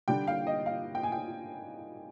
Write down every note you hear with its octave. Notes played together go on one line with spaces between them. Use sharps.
D3 G3 G5
F5
D#5
F5
G5
G#5
G5